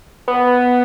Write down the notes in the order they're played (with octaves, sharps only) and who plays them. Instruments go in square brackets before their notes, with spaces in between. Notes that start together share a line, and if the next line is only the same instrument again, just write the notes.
[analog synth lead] B3